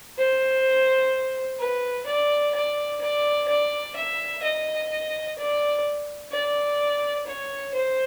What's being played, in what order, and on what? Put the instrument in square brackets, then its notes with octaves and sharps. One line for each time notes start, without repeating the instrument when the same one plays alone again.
[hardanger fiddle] C5
B4
D5
D5
D5
D5
E5
D#5
D5
D5
C#5
C5